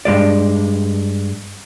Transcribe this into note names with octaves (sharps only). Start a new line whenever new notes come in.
G2 A#2 G#3 D5